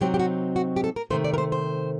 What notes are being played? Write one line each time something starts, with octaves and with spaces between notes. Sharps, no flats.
C3 F#3 C4 D#4 G4
G4
F#4
F#4
G4
A4
A#4
C3 D#3 A3 C5
D5
A#4
C5
C5